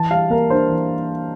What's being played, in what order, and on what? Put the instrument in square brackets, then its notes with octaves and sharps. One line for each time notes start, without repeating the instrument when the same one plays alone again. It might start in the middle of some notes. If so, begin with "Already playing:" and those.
Already playing: [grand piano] E3 [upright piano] A5
[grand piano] G3 [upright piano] F5
[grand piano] A#3 [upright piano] A#4
[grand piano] D4 [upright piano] C5
[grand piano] E3